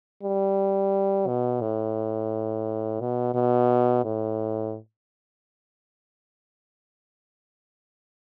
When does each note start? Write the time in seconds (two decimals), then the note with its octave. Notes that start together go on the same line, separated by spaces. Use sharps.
0.23 G3
1.27 B2
1.61 A2
3.00 B2
3.34 B2
4.05 A2